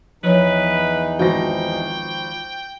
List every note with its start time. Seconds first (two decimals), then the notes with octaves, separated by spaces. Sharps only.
0.23 E2 E3 F3 D#4 B4 C#5
1.19 G#1 F3 F#4 G5 A#6